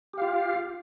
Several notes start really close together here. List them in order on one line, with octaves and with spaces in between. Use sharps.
G4 F5 F4